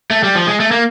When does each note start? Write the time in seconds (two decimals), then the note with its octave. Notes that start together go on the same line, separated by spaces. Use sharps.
0.11 A3
0.23 G3
0.35 F3
0.47 G#3
0.60 A3
0.71 A#3